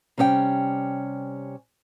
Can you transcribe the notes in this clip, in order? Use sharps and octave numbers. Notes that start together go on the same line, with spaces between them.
C3 G3 C#4 D5 G5